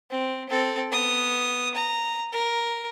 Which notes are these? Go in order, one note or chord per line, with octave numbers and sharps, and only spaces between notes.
C4
C4 A4
B3 D#6
A#5
A#4